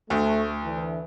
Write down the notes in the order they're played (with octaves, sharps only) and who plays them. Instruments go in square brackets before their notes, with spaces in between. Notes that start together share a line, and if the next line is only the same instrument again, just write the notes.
[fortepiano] D2 [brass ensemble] A3
[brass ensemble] D3 E3